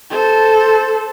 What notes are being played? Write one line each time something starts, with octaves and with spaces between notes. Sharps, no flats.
A4 C5